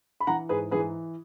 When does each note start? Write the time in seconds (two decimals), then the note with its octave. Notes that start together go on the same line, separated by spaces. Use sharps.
0.20 B5
0.27 E3 F#5 A#5
0.49 G#2 G#4 B4
0.71 E3 G#4 B4